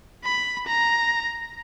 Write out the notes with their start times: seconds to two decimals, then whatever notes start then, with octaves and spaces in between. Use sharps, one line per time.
0.24 B5
0.67 A#5